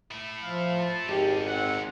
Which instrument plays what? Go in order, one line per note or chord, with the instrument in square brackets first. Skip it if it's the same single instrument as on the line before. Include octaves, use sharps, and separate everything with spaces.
[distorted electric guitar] A3 E4
[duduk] F3 [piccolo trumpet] F5
[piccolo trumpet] A5
[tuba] G#1 [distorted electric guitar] C3 C#4 [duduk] G4
[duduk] C4 [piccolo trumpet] F#5